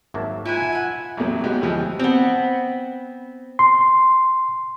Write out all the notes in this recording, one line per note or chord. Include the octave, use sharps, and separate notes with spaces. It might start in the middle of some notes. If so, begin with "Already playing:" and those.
G#1 F#3 A#3 E5 A5
E4 F4 E5 F#5 G#5 A#5
E5 F#5
A1 F2 A#2 F#3 A3
G#3 B3 D#4 F#4 G4
D2 E3 F3 G3 D#5
B3 C4
C6